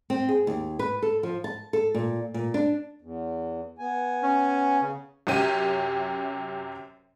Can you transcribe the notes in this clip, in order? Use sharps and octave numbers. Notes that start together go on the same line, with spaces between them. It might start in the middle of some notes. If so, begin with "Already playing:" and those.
C4
G#4
D#2
B4
A4
F3
A5
A4
A#2
A#2
D4
E2
B3 G#5
C#4
C#3
F#2 C3 C#4 G4 D#7